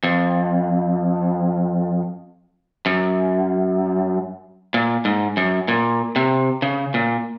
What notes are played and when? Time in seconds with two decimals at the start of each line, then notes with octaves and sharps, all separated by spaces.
0.03 F2
2.86 F#2
4.74 A#2
5.05 G#2
5.37 F#2
5.68 A#2
6.16 C3
6.62 C#3
6.94 A#2